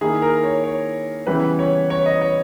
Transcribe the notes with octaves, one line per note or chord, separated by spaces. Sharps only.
D#3 A#3 E4 G#4
A#4
C#5
C#5
C#3 E3 G3 B3 E4 B4
C#5
C#5
D#5
C#5